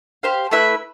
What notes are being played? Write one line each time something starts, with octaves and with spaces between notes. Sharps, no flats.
G4 C5 F5
A3 E4 B4 E5